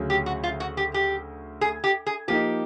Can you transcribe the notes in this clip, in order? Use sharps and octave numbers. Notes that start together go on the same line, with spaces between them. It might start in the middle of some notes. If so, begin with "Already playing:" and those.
Already playing: D2 C#3 F#3
G4
F#4
F4
F#4
G4
G4
G#4
G4
G#4
F3 A#3 D#4 G4